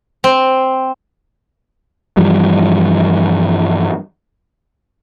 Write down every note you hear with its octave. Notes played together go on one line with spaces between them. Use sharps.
C4
G2 E3 F3 G3